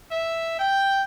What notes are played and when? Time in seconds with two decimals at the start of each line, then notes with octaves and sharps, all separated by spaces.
0.11 E5
0.59 G5